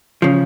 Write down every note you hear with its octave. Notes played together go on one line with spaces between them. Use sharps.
C#3 F3